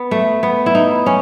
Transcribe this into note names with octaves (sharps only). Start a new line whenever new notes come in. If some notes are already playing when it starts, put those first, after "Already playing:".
Already playing: B3
A3
B3
E4
D#4
C#4